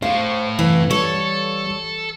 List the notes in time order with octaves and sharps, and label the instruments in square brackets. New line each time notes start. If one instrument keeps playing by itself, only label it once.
[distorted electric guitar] A2 [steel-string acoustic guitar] C5 [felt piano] F5 [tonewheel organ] C#6
[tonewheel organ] F#2 C3 [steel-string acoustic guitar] E3
[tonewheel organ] G3 [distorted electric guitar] A4 [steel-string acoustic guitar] C#5